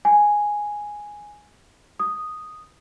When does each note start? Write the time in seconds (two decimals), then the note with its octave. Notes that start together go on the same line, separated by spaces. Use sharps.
0.05 G#5
2.00 D#6